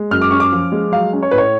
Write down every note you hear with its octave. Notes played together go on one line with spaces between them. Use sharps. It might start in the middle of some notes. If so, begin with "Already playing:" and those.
Already playing: G#3
F#2 F6
D6
C#4 C#6
D6
F3
G#3
F#3 F5
C#4
C#5
A2 B4
C#5